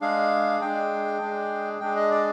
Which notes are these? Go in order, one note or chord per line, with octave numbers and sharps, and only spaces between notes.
G#3 D4 G#4 F5
G#3 D4 G#4 G5
G#3 D4 G#4
G#3 D4 G#4 G5
D#5
D5